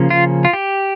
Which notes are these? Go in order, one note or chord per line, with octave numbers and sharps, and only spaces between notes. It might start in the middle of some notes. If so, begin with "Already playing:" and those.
Already playing: C#3 F3 A#3 C#4
F4
F4
G4